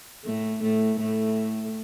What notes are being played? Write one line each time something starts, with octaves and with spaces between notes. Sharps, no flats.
A2 A3
A2 A3
A2 A3